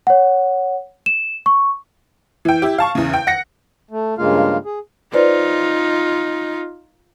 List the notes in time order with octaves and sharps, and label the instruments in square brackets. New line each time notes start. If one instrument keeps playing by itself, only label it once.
[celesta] C#5 F#5
E7
C#6
[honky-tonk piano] E3 G5
E4 G4
F5 A5 C#6
E2 C#3
G5
F#5 A#6 C#7
[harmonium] A3
G2 C#3 G#3 A#3 F4 F5
G#4
[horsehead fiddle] D#4 F4 [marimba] B4 C5 D5